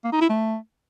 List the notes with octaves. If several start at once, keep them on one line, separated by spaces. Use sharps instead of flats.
A#3
D#4
E4
A3